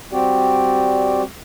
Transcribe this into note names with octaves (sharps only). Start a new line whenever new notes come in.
G3 C4 F#4 G4 D5